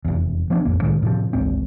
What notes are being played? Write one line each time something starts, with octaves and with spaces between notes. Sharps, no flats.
F1 E2
F3 B3 C#4 D4
A1 F2 B2 A#3
C2 A2 D#3 G#3
A2 C3 E3 F3
D1 A1 G#2 C4